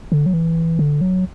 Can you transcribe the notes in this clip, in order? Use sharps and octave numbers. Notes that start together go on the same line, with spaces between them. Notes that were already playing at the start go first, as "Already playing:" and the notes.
D3
F#3
E3
D3
F#3